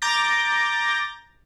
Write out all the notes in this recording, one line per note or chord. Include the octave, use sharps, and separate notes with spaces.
A#5 D6 G6 A6 A#6